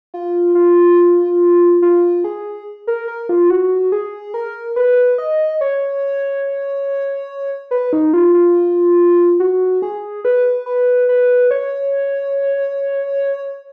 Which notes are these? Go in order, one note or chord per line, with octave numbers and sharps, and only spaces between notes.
F4
F4
F4
G#4
A#4
A#4
F4
F#4
G#4
A#4
B4
D#5
C#5
B4
D#4
F4
F4
F#4
G#4
B4
B4
B4
C#5